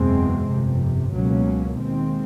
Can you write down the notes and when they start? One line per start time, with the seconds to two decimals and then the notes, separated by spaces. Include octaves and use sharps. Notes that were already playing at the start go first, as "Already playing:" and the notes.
Already playing: F#1 E2 B2 G#3 C4
0.50 G1 F2 C3
1.14 C#2 B2 F#3 A#3 C#4
1.79 D#2 D#3 G#3 C4